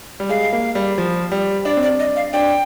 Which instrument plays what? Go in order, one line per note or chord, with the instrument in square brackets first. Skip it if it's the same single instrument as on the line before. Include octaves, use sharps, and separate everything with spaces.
[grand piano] G3
[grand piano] G#3 [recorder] F5
[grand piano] A#3
G3
F3
G3
[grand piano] D4 [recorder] D5
[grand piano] C4
[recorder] D5
[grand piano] D4
[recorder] D#5
F5
[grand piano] D4 [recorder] G5